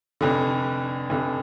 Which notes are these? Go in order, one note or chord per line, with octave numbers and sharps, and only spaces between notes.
F1 F2 D3
F1 F2 D3